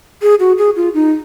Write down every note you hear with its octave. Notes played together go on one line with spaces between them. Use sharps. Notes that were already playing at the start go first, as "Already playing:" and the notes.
G#4
F#4
G#4
F4
D#4